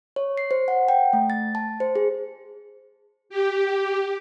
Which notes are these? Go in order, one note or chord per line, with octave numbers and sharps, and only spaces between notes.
C#5
C7
C5
F#5
G5
A3
A6
A5
C5
G#4
G4